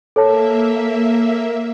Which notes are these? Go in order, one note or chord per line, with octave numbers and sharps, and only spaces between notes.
A#3 A4 C#5 E5 A5